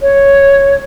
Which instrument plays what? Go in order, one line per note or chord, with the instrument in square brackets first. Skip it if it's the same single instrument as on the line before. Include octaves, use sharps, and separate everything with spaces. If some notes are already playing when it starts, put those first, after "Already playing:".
[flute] C#5